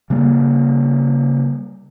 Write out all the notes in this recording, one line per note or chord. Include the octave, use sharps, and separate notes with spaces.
C#3 G3 A#3